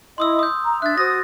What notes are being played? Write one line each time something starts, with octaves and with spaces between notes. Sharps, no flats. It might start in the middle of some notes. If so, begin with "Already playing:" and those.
E4 D#5 C6 D#6 E6
D#6 G6
A#5
D4 E5 F#6 A6
F#4 C5 D#6 A#6